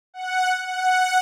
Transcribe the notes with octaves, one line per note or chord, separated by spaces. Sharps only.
F#5
F#5